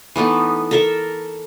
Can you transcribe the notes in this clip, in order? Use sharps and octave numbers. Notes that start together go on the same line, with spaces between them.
E3 A3 B3 D#4
A4 A#4 E5